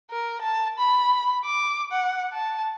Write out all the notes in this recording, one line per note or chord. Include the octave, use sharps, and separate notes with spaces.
A#4
A5
B5
D6
F#5
A5